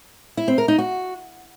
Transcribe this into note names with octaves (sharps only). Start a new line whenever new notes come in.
E4
C4
A#4
D#4
F#4